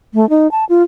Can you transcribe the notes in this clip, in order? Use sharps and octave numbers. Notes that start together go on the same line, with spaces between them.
A3
D#4
A5
F4